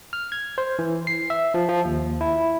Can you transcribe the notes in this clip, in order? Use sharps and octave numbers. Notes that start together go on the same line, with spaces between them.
F6
G#6
C5
E3
C7
E5
F3
F3
D#2
E4